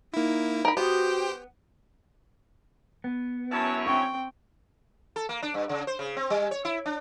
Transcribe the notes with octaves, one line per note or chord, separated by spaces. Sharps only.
A#3 D#4 E4
A#4 B5
B3 F#4 G4 C5 G5
B3
F#2 E4 C#5 A5
C4 G5 C#6
A4
A#3
D4
G2
C#3
C5
C#3
C4
G3
C#5
E4
D4